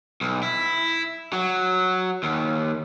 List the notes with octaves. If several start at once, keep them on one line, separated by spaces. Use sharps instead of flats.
B1
E4
F#3
D#2